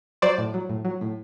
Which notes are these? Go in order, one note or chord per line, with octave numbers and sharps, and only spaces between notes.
F#3 C5 D5
A2
F#3
A2
F#3
A2